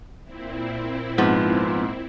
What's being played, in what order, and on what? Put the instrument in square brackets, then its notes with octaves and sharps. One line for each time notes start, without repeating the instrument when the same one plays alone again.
[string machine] A#2 C4 E4
[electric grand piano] G#2 [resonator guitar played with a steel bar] F3 B3